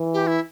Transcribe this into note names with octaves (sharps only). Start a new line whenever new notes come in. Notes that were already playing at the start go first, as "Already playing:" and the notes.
Already playing: E3
G4
E4